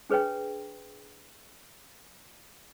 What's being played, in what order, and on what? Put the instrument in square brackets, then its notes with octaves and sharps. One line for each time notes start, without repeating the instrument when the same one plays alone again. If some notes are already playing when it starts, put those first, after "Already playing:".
[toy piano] D4 G#4 B4 C#5 G5